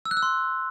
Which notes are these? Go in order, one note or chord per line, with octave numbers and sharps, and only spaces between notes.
E6
F#6
E6
C6